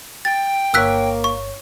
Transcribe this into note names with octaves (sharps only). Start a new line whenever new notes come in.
G5 A6
G1 A#3 C#5 E6 F#6 B6
C#6